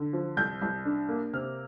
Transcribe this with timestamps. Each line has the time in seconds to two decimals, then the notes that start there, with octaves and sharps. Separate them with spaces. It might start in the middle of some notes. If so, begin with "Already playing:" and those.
Already playing: D3
0.13 F3
0.37 C2 G6
0.62 C2
0.85 D4
1.09 A#3
1.33 C3 F6